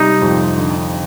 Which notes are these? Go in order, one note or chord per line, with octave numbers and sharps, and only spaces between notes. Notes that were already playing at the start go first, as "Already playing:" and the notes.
Already playing: C3 G3 D#4
F2
D3